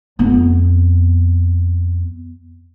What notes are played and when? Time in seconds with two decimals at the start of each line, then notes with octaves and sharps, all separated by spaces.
0.19 F2 B3